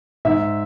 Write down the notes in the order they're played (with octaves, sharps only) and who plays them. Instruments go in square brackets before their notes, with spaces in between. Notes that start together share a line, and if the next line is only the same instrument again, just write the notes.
[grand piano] G#2 E5